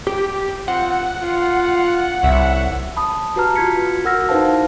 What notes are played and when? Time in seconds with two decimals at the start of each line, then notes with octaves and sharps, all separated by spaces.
0.07 G4
0.68 C4 F4 F#5
1.22 F4
2.23 C2 C#5 E5
2.97 A5 B5 D#6
3.36 F#4 G4 B4 A5 A#5 F6
3.56 F4 F#4 G#6 B6 C#7
4.05 F#4 A#4 F#5 E6 F6 A#6
4.29 D#4 E4 B4 C5 F5 A5